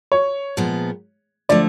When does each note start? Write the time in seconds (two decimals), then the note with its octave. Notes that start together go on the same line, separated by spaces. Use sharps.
0.12 C#5
0.57 A#2 F3 G#3 B3
1.49 D3 F3 A3 D5